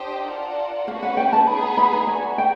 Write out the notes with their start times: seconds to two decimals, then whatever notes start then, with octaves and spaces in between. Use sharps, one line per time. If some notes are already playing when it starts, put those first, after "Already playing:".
Already playing: D4 G4 C5 D#5 G5
0.27 F4 A#4 D5 F#5 A5
0.87 A#3 C#4 F#4 B4 F5
1.03 F#5
1.17 G5
1.33 A5
1.47 B3 D#4 G#4 B5
1.62 A#5
1.77 B5
1.93 A#5
2.07 B3 D4 F#4 G#5
2.38 G5